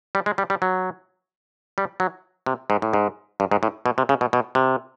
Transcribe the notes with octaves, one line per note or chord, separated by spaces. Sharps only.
G3
G#3
G3
G3
F#3
G3
F#3
C3
G#2
A2
G#2
G2
G#2
A2
B2
C3
C#3
B2
B2
C3